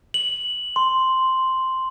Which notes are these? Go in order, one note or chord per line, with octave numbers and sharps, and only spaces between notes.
F#7
C6